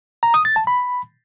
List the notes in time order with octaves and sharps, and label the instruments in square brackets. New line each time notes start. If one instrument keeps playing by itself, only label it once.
[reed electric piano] A#5
D#6
A6
A5
B5